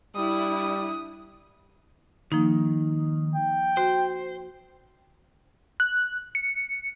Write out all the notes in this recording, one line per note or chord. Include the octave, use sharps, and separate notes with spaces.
G3 D4 E4 D#6
D#3 F3 A#3 D#4
G5
F#4 C5
F#6
C#7